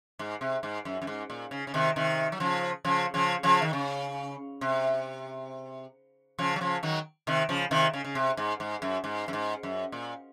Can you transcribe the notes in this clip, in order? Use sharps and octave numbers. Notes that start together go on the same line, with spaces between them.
G#2
C3
G#2
F#2
F#2
G#2
A#2
C#3
C#3
C3 D#3
C3 D#3
F#3
C#3 F3
C#3 F3
C#3 F3
C#3 F3
D#3
C#3
C3
C#3 F3
F#3
C#3 F3
D#3 F#3
C3 D#3
C#3 F3
C3 D#3
C#3
C#3
C3
G#2
G#2
F#2
G#2
F#2
G#2
F#2
A#2